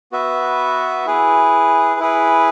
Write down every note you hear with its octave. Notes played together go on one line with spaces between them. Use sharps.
B3 F#4 B4 E5
E4 G#4 B4
E4 G#4 B4